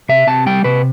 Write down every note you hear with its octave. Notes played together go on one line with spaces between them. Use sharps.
C3 E5
C3 A5
G3 G5
C3 B4